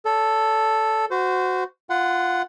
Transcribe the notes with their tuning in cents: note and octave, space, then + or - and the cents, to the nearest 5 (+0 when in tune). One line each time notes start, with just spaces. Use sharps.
A4 +0 C#5 +45
F#4 +0 C5 -25
F4 +0 F#5 +0 C6 -30